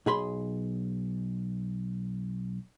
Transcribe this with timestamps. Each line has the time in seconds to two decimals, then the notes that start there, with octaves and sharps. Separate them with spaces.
0.06 B1 G#4 B5 C6